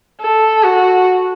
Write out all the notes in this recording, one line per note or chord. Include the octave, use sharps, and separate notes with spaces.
A4
F#4